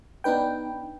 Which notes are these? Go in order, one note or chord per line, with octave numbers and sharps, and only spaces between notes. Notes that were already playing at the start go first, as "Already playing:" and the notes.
B3 D4 D#4 B4 G5